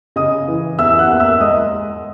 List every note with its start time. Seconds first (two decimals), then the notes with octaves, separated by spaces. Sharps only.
0.16 C#3 D#5 D#6
0.47 E3
0.78 E2 E5 E6
0.99 F#5 F#6
1.10 A#3
1.20 E5 E6
1.40 G#3 D#5 D#6